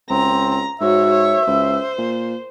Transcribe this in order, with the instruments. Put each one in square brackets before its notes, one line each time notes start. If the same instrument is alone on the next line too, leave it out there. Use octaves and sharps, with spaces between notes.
[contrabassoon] C#2 [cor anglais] C4 [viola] A#5
[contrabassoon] G#2 [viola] F#4 C#5 [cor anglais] E5
[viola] C#5
[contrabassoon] C#2 [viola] C5
[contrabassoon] A#2